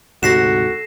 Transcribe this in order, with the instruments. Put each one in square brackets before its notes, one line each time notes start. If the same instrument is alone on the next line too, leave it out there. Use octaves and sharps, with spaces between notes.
[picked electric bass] D2 G#2 C3 [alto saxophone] F#4 [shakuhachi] A4 [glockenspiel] A#6 C7 E7